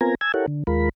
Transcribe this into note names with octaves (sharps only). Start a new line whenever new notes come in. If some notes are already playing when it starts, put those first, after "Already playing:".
B3 C4 F4 A#4 G#5 A#5
G#5 A5 E6 G#6
E4 G4 A4 A#4 C#5 F#5
D3
D#2 G#3 F4 A#4 B5